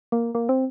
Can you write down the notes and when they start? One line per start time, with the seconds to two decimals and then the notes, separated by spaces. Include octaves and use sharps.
0.12 A#3
0.35 A#3
0.49 C4